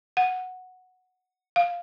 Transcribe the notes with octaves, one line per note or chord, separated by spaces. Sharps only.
F#5
F5